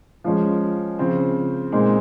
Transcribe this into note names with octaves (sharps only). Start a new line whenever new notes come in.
F3 G#3 C#4
C#3 F3 C4
A#2 G#3 C4 D#4